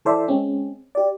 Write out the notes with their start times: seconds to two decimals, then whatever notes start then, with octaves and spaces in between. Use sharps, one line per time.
0.05 E3 A4 C5 D5 E5
0.28 G#3 C4 C#4
0.95 G4 D5